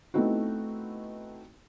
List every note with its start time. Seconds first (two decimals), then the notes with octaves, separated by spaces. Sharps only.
0.14 A3 B3 C4 D#4 E4 F#4